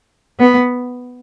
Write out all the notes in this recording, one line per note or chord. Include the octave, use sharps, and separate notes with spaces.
B3